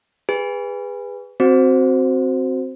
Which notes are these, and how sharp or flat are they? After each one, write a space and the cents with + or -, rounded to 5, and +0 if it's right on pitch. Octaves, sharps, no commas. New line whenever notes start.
G#4 -30 B4 +0
C4 +0 F#4 +0 C5 +0